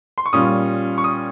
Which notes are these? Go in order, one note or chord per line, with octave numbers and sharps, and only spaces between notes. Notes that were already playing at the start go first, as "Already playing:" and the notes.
C6
C#6
A#2 G3 C#4 F4 D#6
C#6
D#6